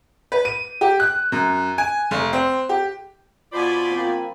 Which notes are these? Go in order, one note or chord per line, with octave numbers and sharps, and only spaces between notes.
B4
D#7
G4
F#6
F#2
G#5
F1
C4
G4
B2 F4 C5 D5 G#5 B5
F3 A#3 C4